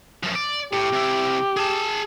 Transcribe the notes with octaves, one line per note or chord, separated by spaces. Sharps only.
F#2 F3
D5
A2 G4
C3 E4
G#4 A5